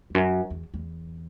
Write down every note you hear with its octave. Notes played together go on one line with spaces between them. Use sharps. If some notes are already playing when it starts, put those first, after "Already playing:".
E2
F#2
E2
E2